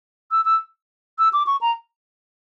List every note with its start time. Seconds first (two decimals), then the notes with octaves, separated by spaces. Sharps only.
0.31 E6
0.45 E6
1.19 E6
1.33 D6
1.47 C#6
1.61 A#5